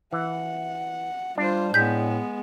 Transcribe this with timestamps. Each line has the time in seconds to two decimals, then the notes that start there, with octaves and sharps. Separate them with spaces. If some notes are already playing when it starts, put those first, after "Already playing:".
0.13 E3 F#5
1.38 G3 D4 F4 C5
1.74 A2 G#3 B3 G6 B6